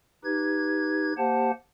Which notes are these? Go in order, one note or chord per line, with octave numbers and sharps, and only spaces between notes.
D#4 G4 B4 G#6
A#3 G4 C5 F#5 A5